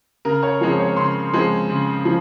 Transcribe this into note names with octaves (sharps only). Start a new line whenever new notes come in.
C#3 A#4
C#5
F3 G#3 C4 C#5
C#5
C#3 C6
F3 G#3 C4
C#3
F3